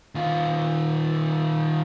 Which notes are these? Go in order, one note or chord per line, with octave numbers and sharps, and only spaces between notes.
D#3 F4